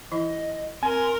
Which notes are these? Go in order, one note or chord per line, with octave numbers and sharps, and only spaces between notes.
E3 E4 D#5
C4 A#4 G#5 C6